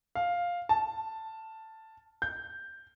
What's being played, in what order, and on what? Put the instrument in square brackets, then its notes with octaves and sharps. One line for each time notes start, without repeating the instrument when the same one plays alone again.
[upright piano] F5
A5
G6